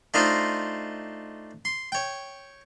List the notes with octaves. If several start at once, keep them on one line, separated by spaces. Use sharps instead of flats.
A3 D4 D#4 F4 C5 D#5
C6
C#5 G5